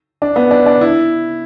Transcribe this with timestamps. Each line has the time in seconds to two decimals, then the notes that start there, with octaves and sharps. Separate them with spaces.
0.22 D4
0.36 B3
0.51 D4
0.66 D4
0.81 E4